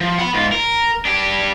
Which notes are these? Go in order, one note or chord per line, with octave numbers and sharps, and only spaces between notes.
F3
F#5 B5
G#2 F4
A#4
D4 G4